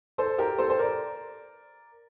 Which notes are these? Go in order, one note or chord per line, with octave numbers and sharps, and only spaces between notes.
A4 C5
G4 A#4
A4 C5
C5
A#4 D5